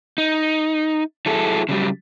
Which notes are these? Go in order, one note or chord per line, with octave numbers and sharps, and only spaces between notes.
D#4
F#3 E4 G#4 A4
C#3 F#3 G3